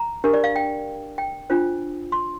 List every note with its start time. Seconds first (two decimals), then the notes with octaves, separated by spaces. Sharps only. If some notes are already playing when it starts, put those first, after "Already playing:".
Already playing: A#5
0.24 D4 G4 A#4
0.34 D5
0.44 F5
0.56 G5
1.18 G5
1.50 D4 F4 C5
2.12 C6